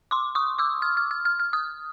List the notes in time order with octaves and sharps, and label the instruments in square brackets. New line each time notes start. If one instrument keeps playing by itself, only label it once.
[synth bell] C6 D6
C#6 D#6
D6 E6
F6
F6
F6
F6
F6
D#6 F6